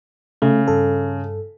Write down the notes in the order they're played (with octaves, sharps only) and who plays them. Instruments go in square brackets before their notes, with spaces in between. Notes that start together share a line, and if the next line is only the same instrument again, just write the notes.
[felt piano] C#3 [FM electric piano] A3
[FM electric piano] G2 A4